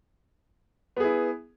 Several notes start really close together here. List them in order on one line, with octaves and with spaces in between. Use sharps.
B3 G#4 E4